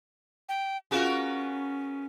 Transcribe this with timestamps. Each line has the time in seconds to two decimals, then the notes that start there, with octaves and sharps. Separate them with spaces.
0.49 G5
0.91 B3 C#4 F4 F#4 G#4 A#4